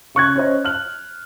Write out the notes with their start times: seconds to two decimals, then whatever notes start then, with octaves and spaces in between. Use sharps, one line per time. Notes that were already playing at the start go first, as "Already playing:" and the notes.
0.15 C#3 C#6 F#6 G#6
0.35 C#4 C5 D#5
0.64 F6 F#6 F#7